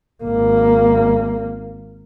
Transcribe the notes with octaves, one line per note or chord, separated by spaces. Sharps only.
G#1 A#3